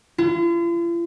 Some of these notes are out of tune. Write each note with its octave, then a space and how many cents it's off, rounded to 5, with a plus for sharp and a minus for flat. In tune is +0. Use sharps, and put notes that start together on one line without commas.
F4 -45